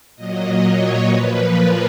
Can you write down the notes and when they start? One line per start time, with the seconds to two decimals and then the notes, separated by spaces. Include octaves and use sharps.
0.16 A#2 F#3 D#5
0.61 C#5
1.07 A#2 F3 B4
1.53 A#4